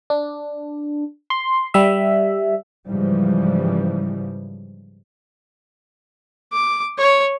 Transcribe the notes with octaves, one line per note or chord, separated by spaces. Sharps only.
D4
C6
G3 E5
G#2 C#3 E3 F3 G3
D6
C#5